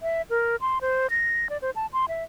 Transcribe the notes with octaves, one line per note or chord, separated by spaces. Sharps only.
E5
A#4
C6
C5
A#6
D5
C5
A5
C6
E5